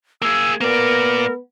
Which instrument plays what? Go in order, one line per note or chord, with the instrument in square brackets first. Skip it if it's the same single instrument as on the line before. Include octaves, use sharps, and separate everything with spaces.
[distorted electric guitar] A#3 G#4 [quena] E6
[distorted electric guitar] A#3 D5 [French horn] B3 [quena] A#4